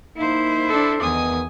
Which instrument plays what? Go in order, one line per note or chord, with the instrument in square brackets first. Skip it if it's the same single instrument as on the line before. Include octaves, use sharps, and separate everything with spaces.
[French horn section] A#3 D#4 [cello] E4 C5
[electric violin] D4 A4
[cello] E2 [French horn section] D#3 B3 [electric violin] G#5 D#6